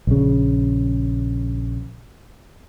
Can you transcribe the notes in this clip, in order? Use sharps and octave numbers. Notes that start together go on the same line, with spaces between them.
A#1 C#3